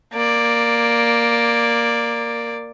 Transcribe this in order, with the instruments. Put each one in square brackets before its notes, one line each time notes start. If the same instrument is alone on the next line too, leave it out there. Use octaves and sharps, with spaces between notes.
[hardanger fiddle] A#3 D5